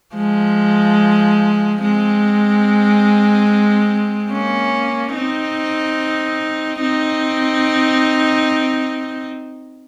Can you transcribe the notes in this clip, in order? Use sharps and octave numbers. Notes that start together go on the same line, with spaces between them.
F3 G#3
G#3 C4
A#3 C#4
C4 D#4
C4 D#4